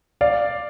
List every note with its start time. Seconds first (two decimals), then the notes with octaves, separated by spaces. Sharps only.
0.21 D5 F5